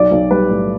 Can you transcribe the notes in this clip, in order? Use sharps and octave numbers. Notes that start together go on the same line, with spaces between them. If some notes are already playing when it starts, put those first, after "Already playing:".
Already playing: B1 D5
B1
G3 B4
A2